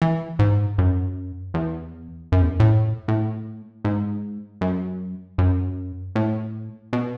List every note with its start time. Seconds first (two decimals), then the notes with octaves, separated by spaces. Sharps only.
0.02 E3
0.39 G#2
0.78 F#2
1.54 E2
2.32 F#2
2.42 E2
2.51 F#2
2.60 A2
3.08 A2
3.85 G#2
4.61 F#2
5.38 F#2
6.16 A2
6.93 B2